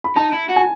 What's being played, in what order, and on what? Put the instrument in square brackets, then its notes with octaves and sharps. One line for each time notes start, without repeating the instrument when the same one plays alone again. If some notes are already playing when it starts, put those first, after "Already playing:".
[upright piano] B5
[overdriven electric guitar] D#4 [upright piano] A5
[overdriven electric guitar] E4
F#4
[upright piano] G#5